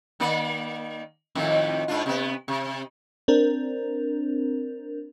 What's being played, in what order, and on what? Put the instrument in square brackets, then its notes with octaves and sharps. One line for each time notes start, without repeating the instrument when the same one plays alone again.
[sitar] D#3 A#3 D5
F2 A2 D#3
G#2 D4 F4
C3 B3
C3
[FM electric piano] C4 D4 A#4